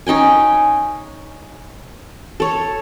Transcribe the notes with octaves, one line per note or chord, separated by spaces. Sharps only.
C#4 D#4 G5 G#5
A4 C#5